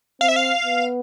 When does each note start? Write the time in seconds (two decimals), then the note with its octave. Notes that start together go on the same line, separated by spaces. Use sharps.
0.21 C4 F5
0.28 E5
0.36 F5
0.64 B3